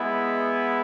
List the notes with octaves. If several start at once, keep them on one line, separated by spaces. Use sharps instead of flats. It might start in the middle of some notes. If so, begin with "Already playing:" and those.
Already playing: G#3 B3 E4